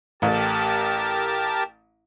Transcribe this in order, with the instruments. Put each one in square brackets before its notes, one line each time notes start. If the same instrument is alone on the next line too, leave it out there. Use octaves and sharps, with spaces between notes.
[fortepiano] A1 [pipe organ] G4 A#4 A5